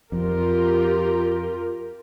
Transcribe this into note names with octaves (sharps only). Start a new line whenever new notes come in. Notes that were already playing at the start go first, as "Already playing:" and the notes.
F2 F4 G4 A#4